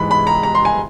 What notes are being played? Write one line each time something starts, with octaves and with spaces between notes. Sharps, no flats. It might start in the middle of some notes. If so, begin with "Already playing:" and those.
Already playing: G#2 E3 G#3 B5
B5
A#5
A#5
C6
G#5